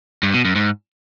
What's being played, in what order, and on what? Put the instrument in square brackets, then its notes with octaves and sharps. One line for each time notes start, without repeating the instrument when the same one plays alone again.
[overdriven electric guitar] G2
B2
F#2
G#2